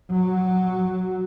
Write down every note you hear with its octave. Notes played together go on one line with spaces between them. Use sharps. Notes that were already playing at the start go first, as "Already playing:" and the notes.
F#3